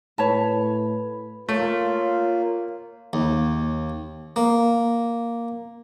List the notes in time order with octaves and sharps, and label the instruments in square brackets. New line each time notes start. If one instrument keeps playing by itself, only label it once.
[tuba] A2 [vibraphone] B4 B5 [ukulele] C#5 A5
[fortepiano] A3 [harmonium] A#3 [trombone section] F4 [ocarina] C#5
[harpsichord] D#2
A#3